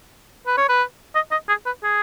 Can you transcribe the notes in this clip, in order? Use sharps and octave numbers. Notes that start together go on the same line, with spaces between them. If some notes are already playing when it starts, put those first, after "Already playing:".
B4
C#5
B4
D#5
D#5
G#4
B4
G#4